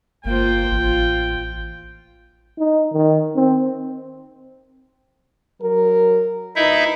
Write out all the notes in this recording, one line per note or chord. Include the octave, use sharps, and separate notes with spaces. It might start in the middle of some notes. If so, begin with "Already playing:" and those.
G1 A#3 F4 C5 G5
A1 F4
D#4
D#3
C4
F#3 A#4
D2 D#4 E4 B4 D#5 E5